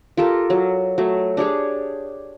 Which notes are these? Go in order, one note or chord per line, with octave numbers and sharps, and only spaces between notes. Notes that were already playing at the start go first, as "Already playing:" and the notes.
F4 G4 A4 A#4
F#3
F#3 A3
D4 G4 G#4 C#5